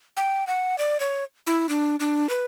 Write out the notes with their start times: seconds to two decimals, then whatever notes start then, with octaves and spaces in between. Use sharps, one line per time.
0.17 G5
0.47 F#5
0.78 D5
1.00 C#5
1.47 E4
1.69 D4
2.00 D4
2.29 B4